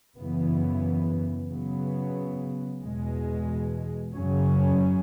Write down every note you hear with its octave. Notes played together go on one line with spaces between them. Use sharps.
F#2 C#3 E3 B3
C#3 F#3 B3
E2 B2 G#3
F#2 C#3 F#3 C#4